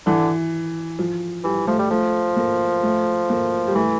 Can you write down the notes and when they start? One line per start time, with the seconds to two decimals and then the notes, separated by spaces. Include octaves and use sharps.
0.06 D3 E3
0.99 F3
1.44 E3 G3
1.67 F3 A3
1.79 G3
1.91 F3 A3
2.37 A#3
2.83 A3
3.30 A#3
3.67 G3
3.75 E3 A3